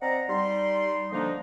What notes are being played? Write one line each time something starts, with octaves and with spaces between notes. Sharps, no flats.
C4 D5 D#5 F#5 A#5
G3 D#4 C6
D3 F3 A#3 D4 D#4